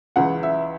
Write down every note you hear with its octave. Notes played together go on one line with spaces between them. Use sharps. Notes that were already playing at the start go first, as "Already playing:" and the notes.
C#2 C#3 E3 F#5
E5